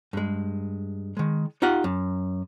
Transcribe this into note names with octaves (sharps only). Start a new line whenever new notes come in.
G2 G#3
D#3 G#3
D#4 F4 G4 F#5
F#2